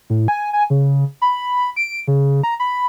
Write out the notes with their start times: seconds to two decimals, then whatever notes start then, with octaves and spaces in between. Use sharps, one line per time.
0.10 A2
0.28 G#5
0.53 G#5
0.70 C#3
1.22 B5
1.76 D7
2.08 C#3
2.44 A#5
2.60 B5